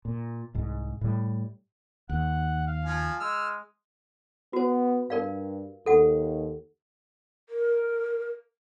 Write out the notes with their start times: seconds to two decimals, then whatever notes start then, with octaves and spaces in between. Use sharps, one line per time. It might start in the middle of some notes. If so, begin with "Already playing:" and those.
0.05 A#2
0.55 C2 G#2
1.01 A2 G3
2.09 D#2 F#5
2.67 F5
2.85 F3 G#5
3.20 G#3 E6 F6
4.53 B3 F#4 C5
5.10 G2 A#4 D5 F5
5.86 D#2 A4 F#5
7.49 A#4